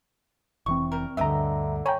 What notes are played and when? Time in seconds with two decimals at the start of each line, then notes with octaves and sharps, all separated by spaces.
0.66 F1 E3 C4 C#6
0.92 G3 A#4
1.17 D2 G2 D3 B3 G4 D#5 E5 A#5
1.86 C#5 G5 G#5 A#5 B5